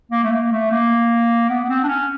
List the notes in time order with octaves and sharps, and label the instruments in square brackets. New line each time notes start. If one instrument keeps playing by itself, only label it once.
[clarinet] A#3
A3
A#3
A3
A#3
B3
B3
C4
D4
C#4